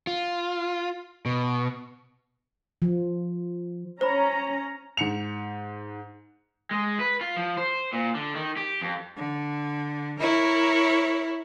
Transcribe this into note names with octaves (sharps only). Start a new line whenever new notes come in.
F4
B2
F3
C#4 C5 A#5 B5
G#2 C#7 F7
G#3
B4
F4
F3
C5
A#2
D3
D#3
G4
F2
D3
E4 A#4 C#5